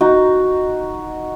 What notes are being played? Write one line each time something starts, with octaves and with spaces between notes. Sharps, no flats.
D#4 F#4